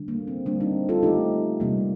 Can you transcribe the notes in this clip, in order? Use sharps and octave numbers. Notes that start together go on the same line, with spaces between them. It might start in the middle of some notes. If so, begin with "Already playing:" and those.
Already playing: D3 G3
A#3
C4
D3 G3 A#3 D4
C4 D#4
F4 A4
D3 A3 D#4 G4
C3 G3 A#3